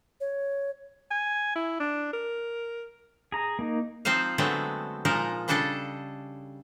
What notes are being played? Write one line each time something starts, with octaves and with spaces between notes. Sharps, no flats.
C#5
G#5
E4
D4
A#4
G#4 A#5
A#3 D#4
F3 C4 D#4 C5 F5
D3 F#3 G#3 A3 B3 C4
A#2 F3 G#3 D#4 A#4
C#3 G3 D4 A4 D#5 A5